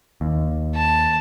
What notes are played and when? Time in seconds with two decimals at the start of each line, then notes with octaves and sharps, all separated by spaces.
0.21 D#2
0.75 A5